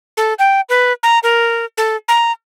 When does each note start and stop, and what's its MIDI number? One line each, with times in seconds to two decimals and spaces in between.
0.17 0.34 69
0.39 0.61 79
0.69 0.93 71
1.03 1.19 82
1.23 1.65 70
1.78 1.96 69
2.08 2.32 82